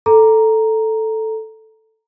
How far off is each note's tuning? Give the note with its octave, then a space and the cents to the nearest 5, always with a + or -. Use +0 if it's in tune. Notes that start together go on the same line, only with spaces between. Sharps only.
A4 +0 A#5 +0